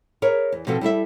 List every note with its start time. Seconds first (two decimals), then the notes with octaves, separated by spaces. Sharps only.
0.22 G#4 A#4 B4 C#5
0.52 E2
0.67 B2 F3 C4 F#4 A4
0.81 G3 E4 A4 E5